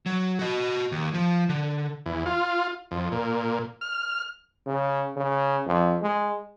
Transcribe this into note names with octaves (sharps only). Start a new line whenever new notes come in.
F#3
F#4 D#5
D#2
F3
D3
E2
F4
F2
A#2
F6
C#3
C#3
F2
G#3